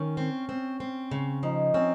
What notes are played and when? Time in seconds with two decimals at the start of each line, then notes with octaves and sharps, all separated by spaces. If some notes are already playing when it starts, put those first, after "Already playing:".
Already playing: D#3 C#4
0.17 C4
0.49 C4
0.80 C4
1.11 C#3
1.43 F3 D#4
1.74 C4 C#4